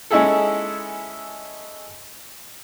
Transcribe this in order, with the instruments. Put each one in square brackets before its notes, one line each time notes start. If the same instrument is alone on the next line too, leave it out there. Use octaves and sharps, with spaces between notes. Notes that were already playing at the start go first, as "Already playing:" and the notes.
[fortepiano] G#3 C#4 D#4 E4 G#4 A4